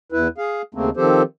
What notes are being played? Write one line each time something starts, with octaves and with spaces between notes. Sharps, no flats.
E2 E4 B4
G#4 F5
D#2 C#3 A3 A#3 C4
D#3 F3 C4 G4 A4 C5